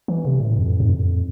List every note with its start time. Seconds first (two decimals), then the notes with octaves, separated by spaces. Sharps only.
0.08 E3
0.25 C3
0.40 A2
0.57 F2
0.80 G#2
0.89 F2